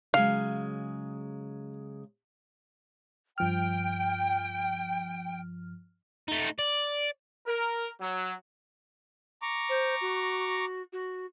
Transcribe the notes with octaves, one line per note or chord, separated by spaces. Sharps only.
C#3 F#3 G#3 F5
G2 F3 G5 F6
A3 D#4
D5
A#4
F#3
A#5 C#6 D6
C5
F#4
F#4